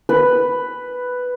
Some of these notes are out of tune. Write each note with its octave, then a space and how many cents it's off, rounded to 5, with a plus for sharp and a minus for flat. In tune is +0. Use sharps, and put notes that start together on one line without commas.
B4 +5